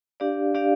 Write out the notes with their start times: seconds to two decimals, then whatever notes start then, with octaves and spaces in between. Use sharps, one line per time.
0.20 D4 G4 D5 F5
0.55 D4 G4 D5 F5